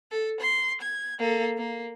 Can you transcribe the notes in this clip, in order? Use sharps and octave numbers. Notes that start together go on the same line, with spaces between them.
A4
C6
G#6
A#3 A4
A#3